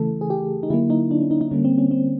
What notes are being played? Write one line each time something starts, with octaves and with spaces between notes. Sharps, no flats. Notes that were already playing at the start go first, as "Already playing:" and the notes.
Already playing: C#3 E3 A3 A4
G#4
G4
D#4
D3 F#3 A#3 E4
D#4
D4
C#4
D#4
D#4
D3 G3 A#3 C#4
C4
C#4
C4